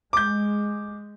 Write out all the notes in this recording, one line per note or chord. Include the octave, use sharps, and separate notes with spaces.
G#3 D6 G6